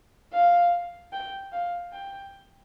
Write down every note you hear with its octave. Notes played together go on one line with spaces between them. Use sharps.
F5
G5
F5
G5